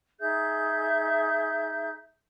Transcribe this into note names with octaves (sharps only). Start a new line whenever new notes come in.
D#4 G#4 E5 G6